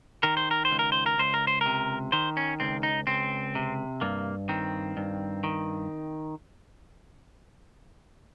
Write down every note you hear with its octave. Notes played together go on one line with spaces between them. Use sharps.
D#3 A#4
C5
A#4
C5
C#2
A#4
C5
A#4
C#2 C5
A#4
C5
C3 A#4
D#3 C5
C#4
C#2 C4
D#4
C#2 C4
C3
G2 A#3
D#3 C4
G2
D#3